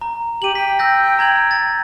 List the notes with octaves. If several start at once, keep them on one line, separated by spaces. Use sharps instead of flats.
A#5
G4 D#7 F#7
G5 B6
E6 G6 A#6
A#5 G#6 F#7
A6